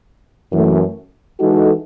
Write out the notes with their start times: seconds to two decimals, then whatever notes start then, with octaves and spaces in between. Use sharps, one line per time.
0.51 F#2 E3 A3
1.39 E3 G#3 D#4 F#4 A4